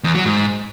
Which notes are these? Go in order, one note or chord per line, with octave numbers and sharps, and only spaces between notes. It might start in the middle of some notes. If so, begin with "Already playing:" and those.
E2
F#3
G#2